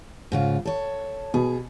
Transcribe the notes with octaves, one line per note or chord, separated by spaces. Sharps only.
G#2 C#3 F4
A4 C#5
B2 G#4